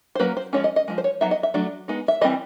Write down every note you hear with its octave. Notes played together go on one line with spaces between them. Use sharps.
C5
F#3 A#3 C#4 B4
C5
F3 G#3 C#4 C#5
D#5
D#5
F3 G#3
C5
C#5
F#3 B3 D#4 E5
D#5
E5
F#3 A3 D4
G#3 B3 D#4
E5
E3 G3 C4 D#5